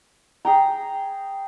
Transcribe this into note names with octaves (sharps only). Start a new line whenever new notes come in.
G#4 G5 A#5